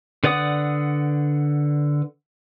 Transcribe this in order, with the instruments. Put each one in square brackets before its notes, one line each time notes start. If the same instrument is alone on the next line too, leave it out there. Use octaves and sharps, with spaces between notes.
[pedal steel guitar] D3 B4 D5 F#5 D#6